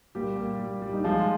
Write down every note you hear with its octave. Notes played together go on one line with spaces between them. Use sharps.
A#2 G3 G4
A#2
G3
G3
D#4
F3 G#3 F4